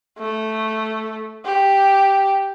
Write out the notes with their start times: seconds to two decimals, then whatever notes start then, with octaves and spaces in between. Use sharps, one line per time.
0.19 A3
1.45 G4